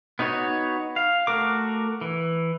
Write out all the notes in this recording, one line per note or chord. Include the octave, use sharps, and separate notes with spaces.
B3 D#4 F#4 C#5
F5
A3 F#4 A#4 D6
E3